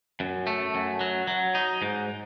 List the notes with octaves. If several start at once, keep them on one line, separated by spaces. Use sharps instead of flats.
F#2
A3
F#2
F#3
F#3
D#4
G#2